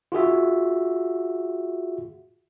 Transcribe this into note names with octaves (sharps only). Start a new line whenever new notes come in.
F4 F#4 G#4 E5